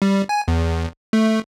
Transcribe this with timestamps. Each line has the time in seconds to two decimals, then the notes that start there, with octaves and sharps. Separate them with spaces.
0.02 G3
0.29 G#5
0.48 E2
1.13 A3